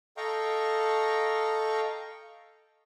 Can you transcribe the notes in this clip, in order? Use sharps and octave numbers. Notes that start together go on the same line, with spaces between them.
A4 D#5 F5 G5 A#5 C#6